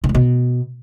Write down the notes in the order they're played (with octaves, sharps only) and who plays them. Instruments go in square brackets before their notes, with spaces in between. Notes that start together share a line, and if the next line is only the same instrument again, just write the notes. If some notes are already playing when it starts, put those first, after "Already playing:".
[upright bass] D3
G2
B2